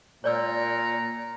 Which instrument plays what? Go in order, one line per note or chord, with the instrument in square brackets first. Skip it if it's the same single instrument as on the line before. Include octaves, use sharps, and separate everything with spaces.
[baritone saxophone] A#2 [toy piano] C#5 D5 E6 [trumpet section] A#5